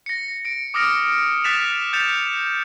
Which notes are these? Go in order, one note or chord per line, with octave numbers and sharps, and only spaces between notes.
A#6 C#7
C#7 D7
D6 D#6 F6 A#6 C#7 D7
D#6 F#6 A6 B6 E7 F7
G6 A6 B6 C#7 E7 F7